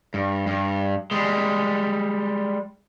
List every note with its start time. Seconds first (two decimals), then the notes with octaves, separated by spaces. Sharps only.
0.14 G2
0.47 G2
1.11 G3 G#3